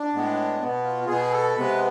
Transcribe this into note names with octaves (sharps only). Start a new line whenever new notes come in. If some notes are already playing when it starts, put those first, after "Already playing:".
Already playing: D4
A2 G#3 B3
B2 B3
F4
F4
B2 B3 G#4
A4
C3 G#3 B3 B4